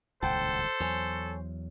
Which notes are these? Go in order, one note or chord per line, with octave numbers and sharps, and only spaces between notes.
D#1 C#2 A2 A4 C5 F#5 G5 A5
E2 F#3 C#5 G#5 C#6